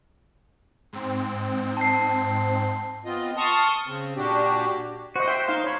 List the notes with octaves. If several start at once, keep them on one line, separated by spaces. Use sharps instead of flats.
G#2 C4
A5 C7
B3 C4 F4 D#5
A5 C6 C#6 D#6 F6
C#3 C4
A#2 D4 F#4 G4
F#4 C5 D#5
C5 E5 G5
D#4 F5 C6
C#5 B5